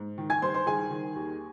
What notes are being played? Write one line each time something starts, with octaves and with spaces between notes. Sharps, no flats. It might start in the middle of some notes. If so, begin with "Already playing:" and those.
Already playing: G#2
D#3
G#5 G#6
G2 C5 C6
C5 C6
D#3 G#4 G#5
D#3
D#2